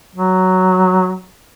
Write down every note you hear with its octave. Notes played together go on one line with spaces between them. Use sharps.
F#3